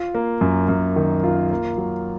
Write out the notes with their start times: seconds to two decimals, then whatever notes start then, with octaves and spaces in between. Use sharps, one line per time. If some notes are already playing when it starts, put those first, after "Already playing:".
Already playing: F4
0.15 A#3
0.41 F#2
0.69 F#2
0.96 D#3
1.24 F4
1.51 A#3
1.78 F#3